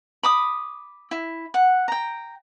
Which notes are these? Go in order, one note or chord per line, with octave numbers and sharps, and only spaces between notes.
B5 D6 D#6
E4
F#5
G5 A#5